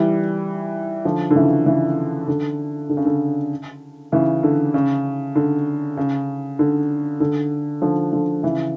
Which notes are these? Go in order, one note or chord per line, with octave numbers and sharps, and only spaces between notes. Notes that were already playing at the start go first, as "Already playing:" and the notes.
Already playing: E3 G3
D3 F3
D3
C#3 E3
C#3 E3
D3
D3
C#3
D3
C#3 E3
D3
C#3
D3
C#3
D3
D3
D3 F3
D3 F3
C#3 E3